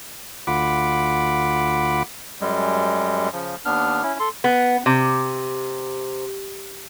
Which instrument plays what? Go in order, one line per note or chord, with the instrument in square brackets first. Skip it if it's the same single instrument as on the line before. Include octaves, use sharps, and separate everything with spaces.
[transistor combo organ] D2 F4 F#5 B5 D6
[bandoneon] F#2 G3 G#3
C#3 F3
D#2 B3 D4 F6
C#4 E4
A4 C6
[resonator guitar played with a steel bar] B3
C3